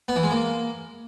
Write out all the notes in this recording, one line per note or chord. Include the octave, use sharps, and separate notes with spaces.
B3
E3
G#3
A#3